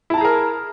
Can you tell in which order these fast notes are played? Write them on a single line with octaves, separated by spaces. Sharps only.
E4 A5 A#5 G#4 A#4